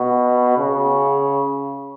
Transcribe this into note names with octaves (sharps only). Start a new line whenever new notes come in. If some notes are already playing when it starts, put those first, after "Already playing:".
Already playing: B2
C#3